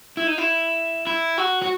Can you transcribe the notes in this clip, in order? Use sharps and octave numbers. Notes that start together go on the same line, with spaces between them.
E4
D#4
E4
E4
F#4
F#4